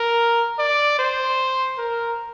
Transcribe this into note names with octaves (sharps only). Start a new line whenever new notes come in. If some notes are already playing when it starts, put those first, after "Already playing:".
Already playing: A#4
D5
C5
A#4